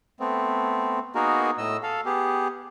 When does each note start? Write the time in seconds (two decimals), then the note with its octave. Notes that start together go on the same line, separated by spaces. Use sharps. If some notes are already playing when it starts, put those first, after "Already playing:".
0.20 A3 B3 C4
1.15 A#3 B3 D#4 F#4 G#4 A#4
1.58 A2 D#5 E6
1.83 A4 F5
2.06 B3 G4 G#4